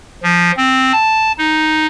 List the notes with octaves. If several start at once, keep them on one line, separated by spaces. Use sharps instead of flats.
F3
C4
A5
D#4